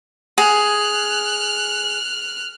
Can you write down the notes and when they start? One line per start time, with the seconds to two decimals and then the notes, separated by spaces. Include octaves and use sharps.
0.38 G#4 F6 F#6